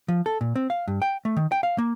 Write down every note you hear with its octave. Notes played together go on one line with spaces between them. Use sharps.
F3
A4
A#2
C4
F5
G2
G5
A3
D#3
G5
F5
A#3